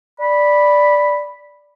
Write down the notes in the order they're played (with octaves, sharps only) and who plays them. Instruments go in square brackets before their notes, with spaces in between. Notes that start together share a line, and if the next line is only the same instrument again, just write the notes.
[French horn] D5 [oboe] B5